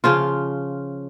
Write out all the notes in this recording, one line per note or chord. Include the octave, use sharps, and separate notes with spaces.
C#3 F3 F4